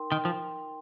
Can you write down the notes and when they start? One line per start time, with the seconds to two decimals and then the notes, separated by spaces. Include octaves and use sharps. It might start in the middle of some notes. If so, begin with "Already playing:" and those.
Already playing: D#4 A#4 G5 C6
0.11 D#3 G5
0.25 F3